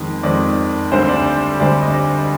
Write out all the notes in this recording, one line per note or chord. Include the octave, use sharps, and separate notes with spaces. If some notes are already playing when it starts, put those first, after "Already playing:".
Already playing: F2 D#3 G#3 C4
F2 D#3 G#3 C4 D5
D2 D3 G3 C4 C5
D5
D5
D2 D3 G3 C4 D5
D#5
D5